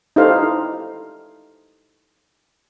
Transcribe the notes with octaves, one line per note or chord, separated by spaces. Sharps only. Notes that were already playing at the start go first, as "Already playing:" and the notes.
D#4 E4 G4 A4 C5 F5